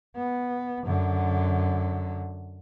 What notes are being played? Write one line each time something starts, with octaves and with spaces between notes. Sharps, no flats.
B3
F#2 D3